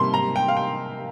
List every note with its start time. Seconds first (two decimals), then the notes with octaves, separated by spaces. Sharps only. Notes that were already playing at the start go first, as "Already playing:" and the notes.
Already playing: C3 G3 A#3 C6
0.14 A#5
0.36 G5
0.48 F5
0.57 G5